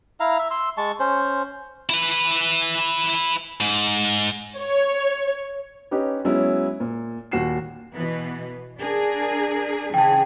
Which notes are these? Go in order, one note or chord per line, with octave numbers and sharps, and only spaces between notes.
E4 F5 A#5
E5
C6 E6
G#3 A5 C#6
C#4 C5
E4 B4
G#2
C#5
C#4 D#4 G4 B4
F#3 G#3 B3 C#4 E4
A#2
D#2 A#2 F#4 C7 E7
B2 E3 B3
D4 G#4 A#4
C#3 E3 G#4 G5 A5